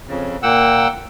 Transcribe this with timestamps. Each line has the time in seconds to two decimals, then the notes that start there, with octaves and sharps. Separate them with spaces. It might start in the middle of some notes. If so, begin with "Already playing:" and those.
0.07 F2 C#3
0.43 A#2 A#3 F#5 G5 E6